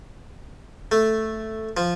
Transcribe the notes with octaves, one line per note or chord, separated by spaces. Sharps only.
A3
F3